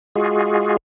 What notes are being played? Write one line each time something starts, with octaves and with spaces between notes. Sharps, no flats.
G#3 F4 F#4 G#4